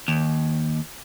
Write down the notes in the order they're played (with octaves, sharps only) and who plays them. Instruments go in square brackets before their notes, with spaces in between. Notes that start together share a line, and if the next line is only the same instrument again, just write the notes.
[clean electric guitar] D#2